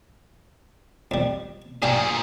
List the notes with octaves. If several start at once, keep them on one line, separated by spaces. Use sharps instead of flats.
F2 G3
A#2 D4 G4 G#4 F5